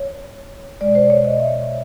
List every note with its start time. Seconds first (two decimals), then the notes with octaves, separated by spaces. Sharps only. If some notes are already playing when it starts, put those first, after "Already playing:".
Already playing: C#5
0.81 B2 G#3 D5
0.95 C5
1.10 C#5
1.25 D#5
1.40 E5